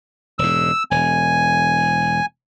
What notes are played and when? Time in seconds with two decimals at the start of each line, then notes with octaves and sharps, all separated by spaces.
0.39 E1 G#2 E6
0.91 E1 G#5